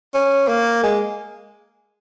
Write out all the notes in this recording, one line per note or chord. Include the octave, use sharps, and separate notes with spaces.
C#4
A#3
G#3